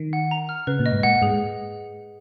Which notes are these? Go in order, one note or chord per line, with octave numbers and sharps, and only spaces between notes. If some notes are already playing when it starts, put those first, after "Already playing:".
Already playing: D#3
F#5
A#5
F6
C#3 B4
A#2
D#5
G#2
A#2 F#5
G#2 G#4